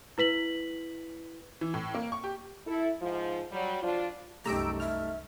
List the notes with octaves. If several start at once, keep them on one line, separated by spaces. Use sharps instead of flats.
E4 B4 B6 F#7
E3
A2
A#3
C#6
G4
E4 A4
G#2 F3
F#3 G3
F3 D4 F4
C2 F#2 A3 D#4 G4 A#5 E6 D7
E5 F6